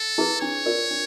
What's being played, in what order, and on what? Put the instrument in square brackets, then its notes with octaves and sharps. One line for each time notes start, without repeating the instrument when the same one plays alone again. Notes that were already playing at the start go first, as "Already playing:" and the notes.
Already playing: [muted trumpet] A4
[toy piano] E4 G#4 B4
[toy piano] D4 [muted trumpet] C#5
[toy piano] F4 A#4 D5
D4